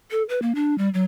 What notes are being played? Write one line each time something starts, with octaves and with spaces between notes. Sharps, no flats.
A4
B4
A#3
D4
G3
F#3